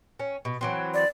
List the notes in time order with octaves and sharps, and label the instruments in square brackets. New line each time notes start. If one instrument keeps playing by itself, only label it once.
[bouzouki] C#4
B2
E3 F#3 C4
[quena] D5